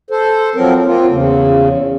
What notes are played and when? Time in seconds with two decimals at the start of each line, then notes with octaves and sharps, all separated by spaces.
0.10 A4 C5
0.55 F3 F#3 C4 A#4
0.86 A#3 C4 F4
1.09 E2 C#3